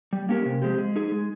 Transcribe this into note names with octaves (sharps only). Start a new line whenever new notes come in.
G3
A#3 C#4 G4 A#4
C3
F3 G#3 C4 G4
G#3
D#4 G#4
G#3